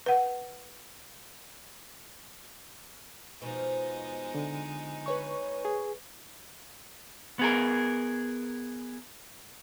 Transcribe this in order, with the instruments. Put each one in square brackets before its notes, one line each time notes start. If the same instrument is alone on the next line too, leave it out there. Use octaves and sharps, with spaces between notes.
[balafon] B4 F#5
[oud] B2 F3 [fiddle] G#3 D#4
[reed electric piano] D3
[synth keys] B4 C#5 C#6
[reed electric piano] G#4
[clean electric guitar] B3 G#4 A#4